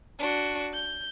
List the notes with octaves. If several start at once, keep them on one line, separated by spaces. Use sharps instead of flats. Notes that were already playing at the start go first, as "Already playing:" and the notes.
D4 F#4
G6